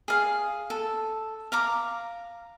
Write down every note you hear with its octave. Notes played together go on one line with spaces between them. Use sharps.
G#4 F5
A4
F5 A#5 D6